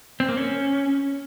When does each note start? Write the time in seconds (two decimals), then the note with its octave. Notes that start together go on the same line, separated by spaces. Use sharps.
0.20 C4
0.29 A#3
0.37 C#4